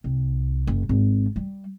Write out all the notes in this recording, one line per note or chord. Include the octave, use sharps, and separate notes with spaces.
C2
F#1
G#1
G3